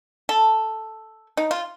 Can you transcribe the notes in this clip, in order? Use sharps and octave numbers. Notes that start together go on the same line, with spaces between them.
A4
D#4
F4